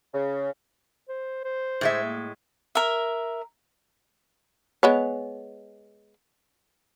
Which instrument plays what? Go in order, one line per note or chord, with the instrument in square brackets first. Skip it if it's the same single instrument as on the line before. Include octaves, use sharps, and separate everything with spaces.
[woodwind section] C#3
[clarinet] C5
C5
[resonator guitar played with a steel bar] A2 G#3 E5
[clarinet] A#3
[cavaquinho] A#4 E5
[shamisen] G#3 B3 C#5